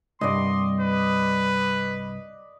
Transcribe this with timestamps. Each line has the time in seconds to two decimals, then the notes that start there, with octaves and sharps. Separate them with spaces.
0.21 C2 G2 D5 D#5 C6
0.80 B4